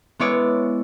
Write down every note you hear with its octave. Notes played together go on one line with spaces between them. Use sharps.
G#3 B3 E4 C#5 D5